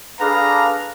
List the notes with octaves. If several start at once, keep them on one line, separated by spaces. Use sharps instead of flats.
D4 G#4 A4 B4 F5 A#5